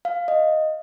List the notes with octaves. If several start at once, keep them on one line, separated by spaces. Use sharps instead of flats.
F5
D#5